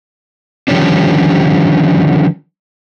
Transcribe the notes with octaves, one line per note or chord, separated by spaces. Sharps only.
D3 D#3 F3 G3 C#4 D4